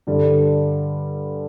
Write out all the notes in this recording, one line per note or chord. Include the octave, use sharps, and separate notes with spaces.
G2 D3 G3